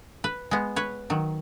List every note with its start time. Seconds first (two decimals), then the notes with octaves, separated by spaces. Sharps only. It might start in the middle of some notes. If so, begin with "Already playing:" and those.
0.24 B4
0.51 G#3 B3
0.76 B4 C#5
1.10 D#3 F#3